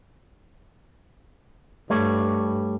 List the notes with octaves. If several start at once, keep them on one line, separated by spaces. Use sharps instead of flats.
G2 G3 A3 C#5